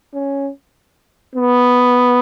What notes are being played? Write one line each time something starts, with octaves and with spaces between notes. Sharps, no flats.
C#4
B3